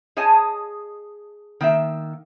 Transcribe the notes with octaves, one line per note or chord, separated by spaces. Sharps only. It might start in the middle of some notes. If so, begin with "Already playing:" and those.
G#4 C#5 D#5 G#5 A5
D#3 A#3 E5